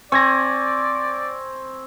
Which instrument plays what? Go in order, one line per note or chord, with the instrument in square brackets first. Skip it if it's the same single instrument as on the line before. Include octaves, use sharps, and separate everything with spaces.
[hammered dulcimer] C4 G#5 [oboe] D5 [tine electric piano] C#6 G#6 A#6